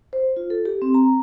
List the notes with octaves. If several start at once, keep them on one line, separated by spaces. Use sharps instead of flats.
C5
F4
A4
G4
C4
A#5